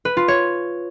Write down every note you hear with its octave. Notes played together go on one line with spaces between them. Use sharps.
B4
F4
C#5